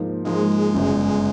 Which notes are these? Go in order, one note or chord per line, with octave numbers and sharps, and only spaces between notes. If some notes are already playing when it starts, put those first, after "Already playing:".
Already playing: G#2 F3 A#3 D#4
G#2 F3 G#3 A#3 D#4
G1 F#2 C#3